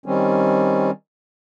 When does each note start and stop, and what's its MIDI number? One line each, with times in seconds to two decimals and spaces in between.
0.06 0.91 51
0.06 0.91 55
0.06 0.91 60
0.06 0.91 61